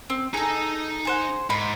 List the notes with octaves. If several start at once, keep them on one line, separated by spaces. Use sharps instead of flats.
C4
D#4 G#4 A4 A#5
G#4 C5 F#5
G#2 B5